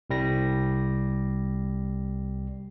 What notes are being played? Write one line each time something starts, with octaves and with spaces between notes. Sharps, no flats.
C2 G3 A#6